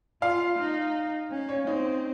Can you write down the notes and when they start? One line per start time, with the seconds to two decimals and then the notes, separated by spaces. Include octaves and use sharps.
0.22 F4 F5
0.58 D#4
1.31 C#4
1.49 C#5
1.67 C4 D#4